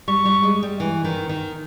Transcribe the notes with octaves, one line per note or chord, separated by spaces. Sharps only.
G3 C#6
G3
G#3
G3
E3
D#3
D#3